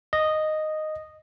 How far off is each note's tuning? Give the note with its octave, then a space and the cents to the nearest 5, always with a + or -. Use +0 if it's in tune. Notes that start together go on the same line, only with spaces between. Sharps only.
D#5 -5